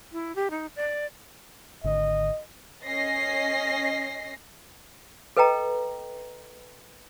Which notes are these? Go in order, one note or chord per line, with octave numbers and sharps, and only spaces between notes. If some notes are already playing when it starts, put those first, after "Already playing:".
E4
G4
D#4
D5
G#1 D3 D#5
C#4 D#5 A#6 C7
A4 B4 D#5 G5 A#5